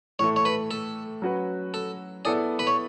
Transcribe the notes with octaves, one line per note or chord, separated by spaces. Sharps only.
A2 E3 A3 C#5
C#5
B4
A4
F#3 C#4 F#4 B4
A4
B3 E4 G#4 A4 D5
B4
C#5